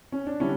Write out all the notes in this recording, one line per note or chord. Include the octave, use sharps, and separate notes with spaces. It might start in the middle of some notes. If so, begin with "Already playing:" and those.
C#4
D4
D3 G3 C#4 E4